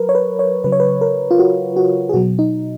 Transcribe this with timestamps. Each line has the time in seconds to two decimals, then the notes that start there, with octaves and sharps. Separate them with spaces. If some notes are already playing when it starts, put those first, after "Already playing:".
Already playing: F#3 A#4 B4
0.09 C#5
0.15 B4
0.39 C#5
0.64 C#3 F#3 B4
0.72 C#5
0.80 B4
1.01 A#4
1.31 F4
1.39 F#4
1.76 F#4
2.09 G#4
2.13 B2 F#3 F#4
2.39 D#4